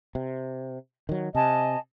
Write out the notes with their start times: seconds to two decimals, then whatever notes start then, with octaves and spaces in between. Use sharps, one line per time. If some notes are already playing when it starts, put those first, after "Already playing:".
0.15 C3
1.09 D#3 F#3
1.35 C3 D#5 G#5 A5